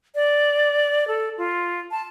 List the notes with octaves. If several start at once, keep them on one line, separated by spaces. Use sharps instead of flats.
D5
A4
F4
A5